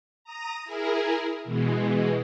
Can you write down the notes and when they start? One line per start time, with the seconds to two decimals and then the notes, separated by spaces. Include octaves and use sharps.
0.24 A#5 D#6 A#6
0.65 E4 G#4 A#4
1.44 B2 E3 G#3